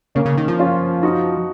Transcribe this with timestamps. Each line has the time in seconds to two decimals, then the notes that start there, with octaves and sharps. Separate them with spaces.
0.15 C#3 A#3 C#4
0.26 C#3
0.37 D#3
0.48 F3
0.59 C#4 F4
1.03 D#4 F#4